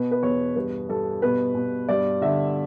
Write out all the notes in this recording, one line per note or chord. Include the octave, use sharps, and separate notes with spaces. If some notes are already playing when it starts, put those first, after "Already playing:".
Already playing: B2 B4
B4
E2 C#5
G2 B4
G2 A4
B2 B4
B2
G2 D5
D3 E5